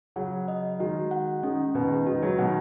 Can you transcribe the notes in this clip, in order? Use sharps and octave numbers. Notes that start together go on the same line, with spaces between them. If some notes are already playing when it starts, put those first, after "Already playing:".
C#3 F#3 F#5
D#5
D#3 G#3 F#4
F#5
D#3 G#3 C#4
B2 D#3 B4
D#3 G#3
D#3 G#3 F#4
C#3 F#3
B2 D#3 F#5